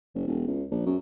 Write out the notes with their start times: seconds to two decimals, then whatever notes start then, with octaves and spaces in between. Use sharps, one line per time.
0.15 F#1
0.27 E1
0.48 C#2
0.71 A#1
0.86 F#2